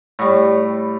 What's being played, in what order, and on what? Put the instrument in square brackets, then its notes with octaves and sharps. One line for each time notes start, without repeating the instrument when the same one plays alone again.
[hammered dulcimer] A2 G3